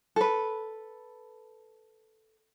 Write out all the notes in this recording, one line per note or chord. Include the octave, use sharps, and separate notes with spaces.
A4 B4